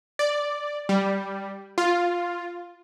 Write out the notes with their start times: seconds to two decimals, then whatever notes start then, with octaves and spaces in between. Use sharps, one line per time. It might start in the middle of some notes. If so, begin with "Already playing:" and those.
0.19 D5
0.89 G3
1.78 F4